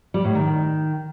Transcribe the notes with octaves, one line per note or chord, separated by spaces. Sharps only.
G3
A2
D#3